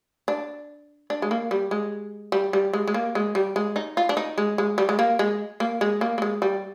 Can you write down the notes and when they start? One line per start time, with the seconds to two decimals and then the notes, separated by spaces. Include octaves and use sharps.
0.28 D4
1.10 D4
1.22 G#3
1.31 A#3
1.51 G3
1.71 G#3
2.32 G3
2.53 G3
2.73 G#3
2.88 G#3
2.94 A#3
3.15 G#3
3.35 G3
3.56 G#3
3.76 D#4
3.97 F4
4.09 D4
4.17 D#4
4.38 G#3
4.58 G#3
4.78 G3
4.89 G#3
4.99 A#3
5.19 G#3
5.60 A#3
5.81 G#3
6.01 A#3
6.18 A#3
6.22 G#3
6.42 G3